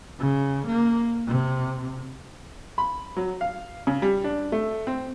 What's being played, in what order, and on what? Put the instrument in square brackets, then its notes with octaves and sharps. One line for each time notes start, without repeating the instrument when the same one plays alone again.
[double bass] C#3
A#3
C3
[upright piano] B5
F#3
F5
C#3
G3
D4
A3
C4